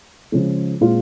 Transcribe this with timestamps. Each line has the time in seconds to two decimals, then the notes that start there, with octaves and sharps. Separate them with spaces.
0.32 C#3 F3 G#3
0.81 A#2 G#3 C4 F4